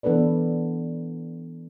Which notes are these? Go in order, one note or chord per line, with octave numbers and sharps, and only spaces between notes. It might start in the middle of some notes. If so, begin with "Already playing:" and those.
E3 B3 D4 A4 B4 D5